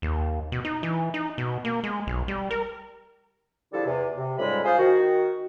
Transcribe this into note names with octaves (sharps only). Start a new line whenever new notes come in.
D#2
B2
D#4
E3
D#4
B2
A#3
G#3
B1
G3
A#4
D3 F3 G3 E4 G#4 A4
E2 C3
C3
F2 G#2 C#3 G3 G#3 B5
F4 G#4 C5
D#3 F#4